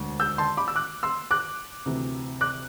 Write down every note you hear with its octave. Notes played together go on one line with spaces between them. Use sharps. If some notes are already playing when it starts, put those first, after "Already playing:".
Already playing: E1 D2 D3
E6 G6
A5 C6
B5 D6
E6
D6 F#6
C6 E6
D6 F#6
D2 C3 E3
D6 F#6